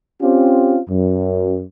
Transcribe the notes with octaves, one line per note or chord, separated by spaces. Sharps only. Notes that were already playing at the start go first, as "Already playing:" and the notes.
C4 C#4 F4 G4
F#2